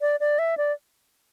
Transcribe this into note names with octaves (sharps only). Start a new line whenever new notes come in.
D5
D5
E5
D5